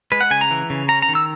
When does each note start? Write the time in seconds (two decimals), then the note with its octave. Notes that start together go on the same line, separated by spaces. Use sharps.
0.12 G#3 B4
0.21 F#5
0.31 C#3 G#5
0.41 A#5
0.51 E3
0.70 C#3
0.89 C#4 A#5
1.02 A#5
1.09 D#3
1.15 E6